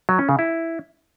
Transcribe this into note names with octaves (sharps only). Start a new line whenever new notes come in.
F#3
C#4
C#3
E4